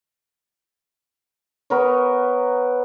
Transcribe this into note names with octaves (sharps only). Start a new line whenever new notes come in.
B3 A#4 C#5